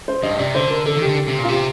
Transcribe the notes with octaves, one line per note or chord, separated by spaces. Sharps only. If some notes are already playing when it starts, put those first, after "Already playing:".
C5
G2 D#5
C3 D5
D3 C5
A#4
D3 A4
D#3
G4
D3
C3
A#2
F4
C3 G4